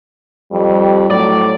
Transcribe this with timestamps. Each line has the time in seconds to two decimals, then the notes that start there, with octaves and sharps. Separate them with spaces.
0.52 F2 G3
1.10 A2 F#3 D5